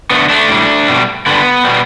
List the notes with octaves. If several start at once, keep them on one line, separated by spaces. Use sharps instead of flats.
D3 A3 B3
A3 D4
A2 G3
B2 G3
D3 G3 B3
B2 G3